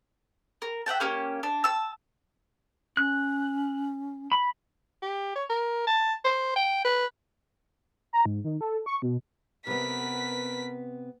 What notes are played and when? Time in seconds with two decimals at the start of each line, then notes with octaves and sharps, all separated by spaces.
0.62 A#4
0.86 E5 F#5 G5 A5
1.00 A#3 C#4 G4
1.43 D4
1.64 A5 E6
2.97 C#4 F#6
4.32 B5
5.02 G4
5.36 C#5
5.50 A#4
5.87 A5
6.25 C5
6.56 G5
6.85 B4
8.13 A#5
8.26 G#2
8.44 D#3
8.61 A4
8.86 C#6
9.02 B2
9.67 C3 B3 A#4 B4 B6